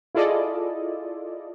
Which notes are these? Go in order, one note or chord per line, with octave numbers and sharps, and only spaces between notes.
E4 F4 G#4 A4 D5 D#5